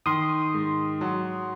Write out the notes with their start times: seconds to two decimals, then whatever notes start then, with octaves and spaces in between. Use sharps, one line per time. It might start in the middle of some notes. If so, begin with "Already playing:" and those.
0.06 D#3 C6 D#6
0.54 G#2
1.01 F#3